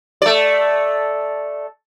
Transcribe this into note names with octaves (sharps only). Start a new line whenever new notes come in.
A3 D5